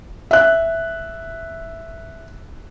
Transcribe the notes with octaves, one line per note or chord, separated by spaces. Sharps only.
E5 F#6